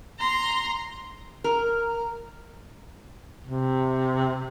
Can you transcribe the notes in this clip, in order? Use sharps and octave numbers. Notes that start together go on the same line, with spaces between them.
A#5 C6
A#4
C3